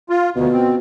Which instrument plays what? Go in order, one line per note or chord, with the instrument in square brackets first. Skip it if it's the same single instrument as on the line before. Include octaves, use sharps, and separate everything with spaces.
[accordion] F4
[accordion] D2 [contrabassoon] B2
[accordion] C4